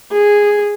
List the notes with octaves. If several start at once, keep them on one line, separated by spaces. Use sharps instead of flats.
G#4